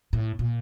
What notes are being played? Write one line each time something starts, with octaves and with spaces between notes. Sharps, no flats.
A2
A#2